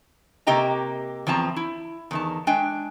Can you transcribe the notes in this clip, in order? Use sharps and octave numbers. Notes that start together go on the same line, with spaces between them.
C3 A#3 G4 D#5 G5 A#5
E2 F3 C4 A5 A#5
E4
E2 D#3 A5
G#3 D4 G5 G#5